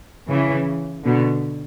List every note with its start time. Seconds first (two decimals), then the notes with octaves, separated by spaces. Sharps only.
0.29 C#3 E3
1.05 B2 D3